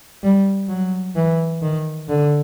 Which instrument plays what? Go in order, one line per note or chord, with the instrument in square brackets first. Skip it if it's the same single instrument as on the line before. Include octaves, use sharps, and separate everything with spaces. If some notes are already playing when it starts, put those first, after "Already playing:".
[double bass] G3
F#3
E3
D#3
D3